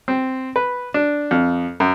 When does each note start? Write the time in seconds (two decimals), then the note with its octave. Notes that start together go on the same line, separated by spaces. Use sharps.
0.08 C4
0.56 B4
0.94 D4
1.31 F2
1.80 F#2